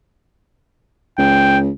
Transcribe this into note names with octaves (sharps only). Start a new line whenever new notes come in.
C#2 G5